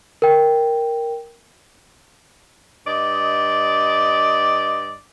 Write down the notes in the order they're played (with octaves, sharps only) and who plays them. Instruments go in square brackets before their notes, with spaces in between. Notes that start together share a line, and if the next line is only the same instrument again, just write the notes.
[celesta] A#4 G5
[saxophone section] G2 D5 D#5